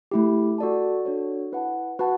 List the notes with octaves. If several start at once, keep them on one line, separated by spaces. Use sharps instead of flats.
A3 E4 G4
F#4 A4 D5 A5
D4 F#4 A4 C#5
E4 B4 F#5 A5
F#4 B4 F#5 A5